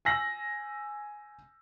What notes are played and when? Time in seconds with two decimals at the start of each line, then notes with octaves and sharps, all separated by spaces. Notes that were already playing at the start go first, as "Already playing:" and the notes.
0.05 G#5 E6 A#6 F#7